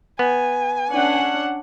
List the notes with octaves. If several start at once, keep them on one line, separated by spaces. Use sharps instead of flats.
B3 G#5
C#4 D4 F#5